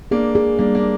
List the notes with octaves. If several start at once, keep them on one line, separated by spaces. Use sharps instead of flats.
A#3 D4 G#4
G#4
G3 A#3 D4
A#3 D4